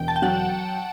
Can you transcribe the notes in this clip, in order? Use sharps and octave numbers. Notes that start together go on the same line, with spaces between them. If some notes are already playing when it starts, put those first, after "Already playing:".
Already playing: E1 G5
A5
G5
F#3 F#5